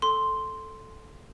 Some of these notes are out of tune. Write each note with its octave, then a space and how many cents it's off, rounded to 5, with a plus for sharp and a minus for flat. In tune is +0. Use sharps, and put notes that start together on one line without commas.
A4 +0 C6 +0